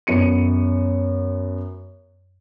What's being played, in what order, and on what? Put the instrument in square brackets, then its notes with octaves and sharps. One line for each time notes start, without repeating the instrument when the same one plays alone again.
[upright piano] F#2 B3 C#7 D#7